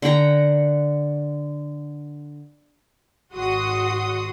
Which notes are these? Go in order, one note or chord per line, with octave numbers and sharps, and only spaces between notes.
D3 F#5 G5 A#5
G#1 F#4 F#5 C6 D#6